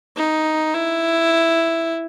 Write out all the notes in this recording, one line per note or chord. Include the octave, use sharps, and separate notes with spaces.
D#4
E4